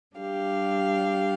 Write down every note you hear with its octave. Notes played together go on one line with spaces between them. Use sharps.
G3 D4 G4 F5